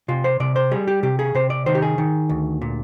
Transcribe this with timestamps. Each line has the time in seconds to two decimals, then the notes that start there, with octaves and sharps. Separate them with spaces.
0.08 C3 F4
0.24 C5
0.40 C3 D5
0.56 C5
0.71 G3 G#4
0.88 G4
1.03 C3 G4
1.19 G#4
1.35 C3 C5
1.50 D5
1.66 D#3 C5
1.75 G4
1.82 G#4
1.98 D#3
2.29 D2
2.62 A#2